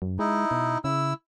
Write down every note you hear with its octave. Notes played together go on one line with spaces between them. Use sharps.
F#2
G#3 D#4 E4
B2
C#3 E4 E6